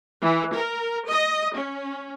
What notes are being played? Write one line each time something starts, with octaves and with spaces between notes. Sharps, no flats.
E3
A#4
D#5
C#4